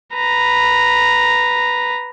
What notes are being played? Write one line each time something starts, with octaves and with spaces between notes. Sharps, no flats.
B4 A#5